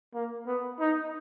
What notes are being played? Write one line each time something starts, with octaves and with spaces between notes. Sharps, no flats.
A#3
B3
D#4